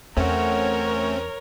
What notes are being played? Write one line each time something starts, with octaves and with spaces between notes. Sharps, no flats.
E2 A3 C4 C#4 F#4 A#4 C#5